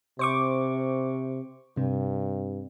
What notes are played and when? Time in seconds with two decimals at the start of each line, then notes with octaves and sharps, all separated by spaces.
0.19 C3 C5 C#6 D6
1.77 G2 C3